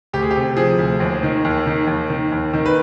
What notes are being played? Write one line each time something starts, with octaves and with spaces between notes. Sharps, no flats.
D2 G4
G#4
G4
C3
F3 G#4
D2
D#2
D#3
D#2
D#3
D#2
D#3
D#2
D#3
B4